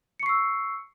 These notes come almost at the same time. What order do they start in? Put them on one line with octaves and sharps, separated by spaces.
C#7 C#6 C7 E6